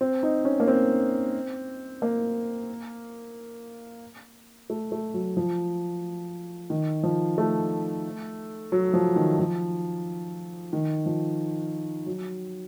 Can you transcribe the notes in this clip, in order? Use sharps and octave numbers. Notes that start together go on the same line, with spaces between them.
C4
D#4
C#4
A#3
C4
A#3
A3
A3
F#3
F3
D#3
F3
A3
F#3
F3
D#3
F3
D#3
F3
F#3